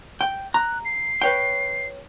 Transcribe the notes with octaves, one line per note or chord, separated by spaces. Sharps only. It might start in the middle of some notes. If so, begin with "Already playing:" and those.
G5
A#5 F#6
C7
B4 C#5 G5